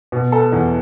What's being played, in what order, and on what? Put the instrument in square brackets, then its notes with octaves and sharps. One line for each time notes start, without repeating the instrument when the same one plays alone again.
[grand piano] B2
A4
E2